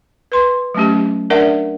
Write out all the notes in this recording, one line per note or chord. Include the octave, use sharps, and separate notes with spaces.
B4 C6
F#3 A3 C#4 G4
D4 A#4 D5 E5 F#5